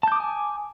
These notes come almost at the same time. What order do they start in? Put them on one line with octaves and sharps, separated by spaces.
A5 G6 D6 D#6 G#5